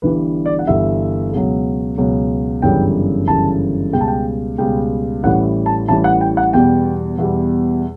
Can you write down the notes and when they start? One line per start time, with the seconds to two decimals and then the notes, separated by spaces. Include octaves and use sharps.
0.02 G1 G2 E3 G3 B4
0.46 D5
0.59 F#5
0.67 G1 G2 E3 G3 E5
1.33 C#2 B2 F#3
1.98 C#2 B2 F#3
2.62 G1 F#2 C#3 E3 G3 G5
3.28 G1 F#2 C#3 E3 G3 A5
3.93 C#2 B2 G3 G5
4.01 A5
4.08 G5
4.58 C#2 B2 G3 G5
5.23 A1 A2 E3 G3 F#5
5.66 A5
5.88 A1 A2 E3 G3 A5
6.04 F#5
6.21 G5
6.37 F#5
6.53 E2 B2 G3 G5
7.18 E2 B2 G3